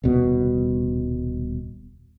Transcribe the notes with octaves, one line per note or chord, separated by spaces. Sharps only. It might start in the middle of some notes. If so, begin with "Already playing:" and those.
D#1 C2 B2